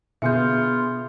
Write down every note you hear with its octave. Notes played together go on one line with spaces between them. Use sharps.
B2 D3 B3 F4 G#4 E5 G6 C#7